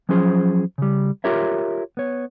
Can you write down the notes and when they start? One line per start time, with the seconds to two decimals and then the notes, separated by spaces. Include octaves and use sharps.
0.09 F3 F#3 C#4 F4 G#4 C5
0.78 C#3 G3
1.24 F4 G4 A#4 C#5 E5
1.97 B3 C#5